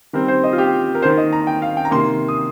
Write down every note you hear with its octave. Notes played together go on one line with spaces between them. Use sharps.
D#3 G3 C4 A#4
C5
D#5
F4
G4
A#4
D#3 A#3 C5
D#5
A#5
G5
F5
G5
A#5
C3 D#3 A#3 C6
D#6